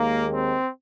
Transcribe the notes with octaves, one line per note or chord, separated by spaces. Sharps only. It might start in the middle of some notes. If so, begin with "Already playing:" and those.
Already playing: D#2 D#3 G#3 A#3
C4